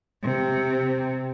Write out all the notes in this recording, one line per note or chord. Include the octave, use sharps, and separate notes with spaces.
C3